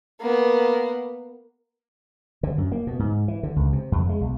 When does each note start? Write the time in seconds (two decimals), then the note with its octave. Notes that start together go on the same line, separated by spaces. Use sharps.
0.21 A#3 B3
2.43 D3
2.58 F#2
2.72 A#3
2.87 B2
2.99 G#2
3.28 E3
3.43 D3
3.56 C#2
3.73 C3
3.92 F2
4.09 G#3
4.21 B1